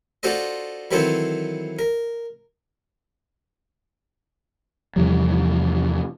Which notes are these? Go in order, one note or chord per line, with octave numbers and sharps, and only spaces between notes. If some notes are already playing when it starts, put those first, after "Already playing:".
D4 F4 F#4 A4 C5 D#5
D#3 E3 F#3 C4 A4 C5
A#4
E2 C3 F3 G3